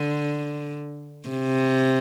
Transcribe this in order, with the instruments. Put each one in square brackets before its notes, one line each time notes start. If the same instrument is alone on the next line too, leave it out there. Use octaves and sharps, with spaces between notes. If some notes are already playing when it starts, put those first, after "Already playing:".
Already playing: [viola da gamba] D3
C3